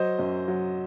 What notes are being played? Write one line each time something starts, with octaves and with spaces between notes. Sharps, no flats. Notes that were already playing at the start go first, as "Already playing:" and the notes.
Already playing: F#3 C5 D#5
F#2
F#3